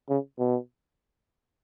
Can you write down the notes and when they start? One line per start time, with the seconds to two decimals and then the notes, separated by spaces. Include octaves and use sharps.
0.09 C#3
0.39 B2